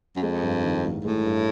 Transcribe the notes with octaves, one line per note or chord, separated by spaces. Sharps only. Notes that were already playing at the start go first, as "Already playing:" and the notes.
F#2
F2 G#3
G2
D#3
A1
A2 G#3
G2